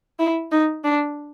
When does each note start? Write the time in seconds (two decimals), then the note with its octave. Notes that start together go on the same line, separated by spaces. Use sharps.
0.19 E4
0.52 D#4
0.84 D4